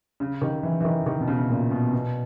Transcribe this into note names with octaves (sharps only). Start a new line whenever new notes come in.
C#3
D#3
E3
E3
D#3
D#3
B2
C#3
A#2
B2
B2